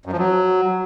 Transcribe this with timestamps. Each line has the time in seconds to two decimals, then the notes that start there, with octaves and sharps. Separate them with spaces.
0.06 F#2
0.12 F3
0.19 F#3